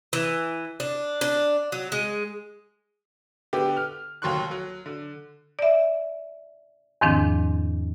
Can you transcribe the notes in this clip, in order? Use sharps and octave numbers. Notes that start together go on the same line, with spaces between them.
E3
D4
D4
F#3
G#3
D3 B3 G4
F6
F1 D#2 F#3 C6 C#6 F#6
F#3
D3
D5 E5
E2 G#2 D#3 F3 C4 D4